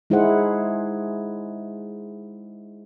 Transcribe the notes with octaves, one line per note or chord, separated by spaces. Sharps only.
G#3 D#4 E4 G#4 C5 F#5